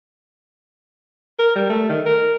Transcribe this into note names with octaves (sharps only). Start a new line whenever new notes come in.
A#4
G3
A3
D#3
A#4